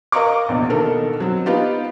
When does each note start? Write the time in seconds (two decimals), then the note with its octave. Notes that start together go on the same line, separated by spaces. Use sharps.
0.12 A#4 D#5 F5 A#5 C#6 D6
0.49 A#1 E2 B2
0.70 B2 D#3 A4 A#4
1.20 F#3 C4
1.46 B3 D#4 F4 G4